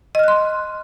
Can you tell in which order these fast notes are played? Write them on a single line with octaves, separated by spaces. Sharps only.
D#5 F6 F#6 C6